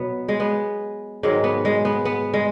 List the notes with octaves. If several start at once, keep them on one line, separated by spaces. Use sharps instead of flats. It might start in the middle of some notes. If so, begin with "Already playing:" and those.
Already playing: B2 F#3 B3
G#3
B3
G#2 D#3 F#3 G#3
B3
G#3
B3
B3
G#3